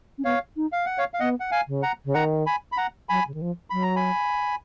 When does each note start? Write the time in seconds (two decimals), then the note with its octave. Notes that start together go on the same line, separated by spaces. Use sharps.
0.18 C#4
0.25 B3 C#5 F5
0.56 D#4
0.72 F5
0.86 F#5
0.98 C#5 F5
1.14 F5
1.20 B3 D#5 F#5
1.40 F#5
1.51 F5 G#5
1.68 C#3
1.83 F#5 A#5
2.05 C#3
2.14 D#3 F#5 A#5
2.46 G#5 B5
2.72 B5
2.77 F#5 A#5
3.09 F#3 G#5 B5
3.27 C#3
3.34 D#3
3.42 F3
3.70 F#3 B5
3.82 A#5
3.96 G#5 B5